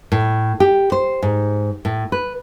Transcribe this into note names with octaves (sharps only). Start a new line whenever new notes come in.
A2
G4
C5
G#2
A2
B4